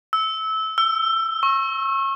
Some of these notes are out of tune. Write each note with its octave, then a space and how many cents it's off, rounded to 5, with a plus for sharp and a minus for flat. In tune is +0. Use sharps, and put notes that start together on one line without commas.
E6 -20
E6 +20
C#6 -30